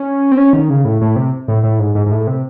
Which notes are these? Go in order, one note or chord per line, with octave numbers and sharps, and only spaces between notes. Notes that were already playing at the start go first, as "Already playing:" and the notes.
Already playing: C#4
C4
C#4
D#3
C#3
A2
A2
C3
A2
A2
G#2
G#2
G#2
A2
C3